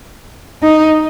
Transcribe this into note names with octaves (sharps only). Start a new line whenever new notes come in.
D#4